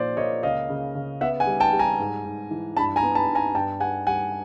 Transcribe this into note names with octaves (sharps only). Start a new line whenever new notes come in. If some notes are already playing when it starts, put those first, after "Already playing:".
Already playing: A#2 F3 C5 D5
A#3 C#5 D#5
C#2 D#5 F5
C#3
C#3
B3 E5 F#5
F#5 G#5
G3
G5 A5
G3
G#5 A#5
G#2
G#2
E3
G2 A5 B5
G#5 A#5
B3
A5 B5
G2
G#5 A#5
G2 G5 A5
G3 F#5 G#5
G3 F#5 G#5